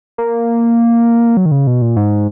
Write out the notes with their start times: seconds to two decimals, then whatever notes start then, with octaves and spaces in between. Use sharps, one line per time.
0.18 A#3
1.37 F#3
1.46 D#3
1.52 C#3
1.67 B2
1.82 A#2
1.96 G#2